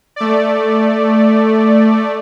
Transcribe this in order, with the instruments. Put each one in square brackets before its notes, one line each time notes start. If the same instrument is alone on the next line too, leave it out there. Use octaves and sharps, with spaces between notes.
[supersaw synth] A3 D5